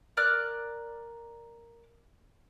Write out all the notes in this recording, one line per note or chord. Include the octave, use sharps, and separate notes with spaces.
A#4 D5 F6 F#6